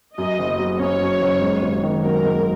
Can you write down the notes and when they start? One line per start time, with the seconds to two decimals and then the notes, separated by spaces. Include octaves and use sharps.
0.17 F#2 D#5
0.39 F#1
0.59 F#3
0.79 C#4 C#5
1.01 F#2
1.21 F#1
1.42 G#2
1.63 G#1
1.83 D#3
2.04 F#3 A#4
2.25 G#2